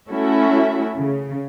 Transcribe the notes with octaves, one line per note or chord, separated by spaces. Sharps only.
A3 C#4 E4 F#4 E5
C#3